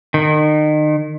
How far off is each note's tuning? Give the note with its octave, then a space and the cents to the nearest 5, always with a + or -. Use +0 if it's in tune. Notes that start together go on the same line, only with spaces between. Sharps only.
D#3 -35